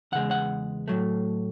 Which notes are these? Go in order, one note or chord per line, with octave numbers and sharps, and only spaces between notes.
E2 C#3 G#3 F#5
F#5
A2 F#3 A3